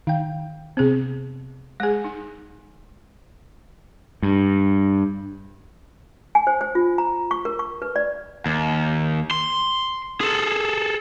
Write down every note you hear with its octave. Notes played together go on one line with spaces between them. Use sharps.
D#3 F5 G5
C3 B3 C4 G#4
G#3 G#4 G#5 A#6
D#4
G2
G#5
C5
C5
F4
A#5
C#6
A#4
C#6
B4
D5
D#2
C6
G#4 A4